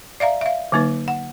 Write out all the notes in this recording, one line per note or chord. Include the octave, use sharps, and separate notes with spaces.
D5 E5 F5 A#5
E5 F5
D3 F#3 A#3 D#4 B4
F#5